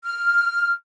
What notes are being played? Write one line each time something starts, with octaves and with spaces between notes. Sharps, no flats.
F6